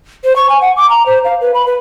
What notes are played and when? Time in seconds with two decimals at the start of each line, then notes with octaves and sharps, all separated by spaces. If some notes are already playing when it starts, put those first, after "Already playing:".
0.24 C5
0.36 C#6
0.49 G#5
0.61 F#5
0.76 D6
0.90 A#5
1.06 C5
1.25 F5
1.41 B4
1.54 B5
1.66 B4